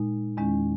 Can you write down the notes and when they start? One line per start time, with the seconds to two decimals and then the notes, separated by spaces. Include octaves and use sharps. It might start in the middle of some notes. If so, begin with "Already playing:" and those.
Already playing: A#2 G#3 D#4
0.37 E2 D#3 G#3 C#4